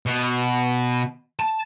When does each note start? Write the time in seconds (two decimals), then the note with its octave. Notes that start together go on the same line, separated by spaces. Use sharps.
0.06 B2
1.39 A5